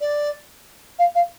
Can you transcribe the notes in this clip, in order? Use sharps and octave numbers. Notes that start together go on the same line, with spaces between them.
D5
F5
F5